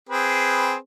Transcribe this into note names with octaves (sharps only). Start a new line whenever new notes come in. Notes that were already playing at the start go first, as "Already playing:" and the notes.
C4 G#4 B4